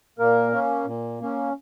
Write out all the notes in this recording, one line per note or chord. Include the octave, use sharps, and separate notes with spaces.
A#2 A#3 A#4
A#3 C#4
A#2
A#3 C#4